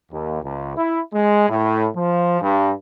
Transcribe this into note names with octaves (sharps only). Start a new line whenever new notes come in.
D#2
C#2
E4
G#3
A2
F3
G2